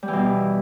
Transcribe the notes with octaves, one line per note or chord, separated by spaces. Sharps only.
G3
E3
B2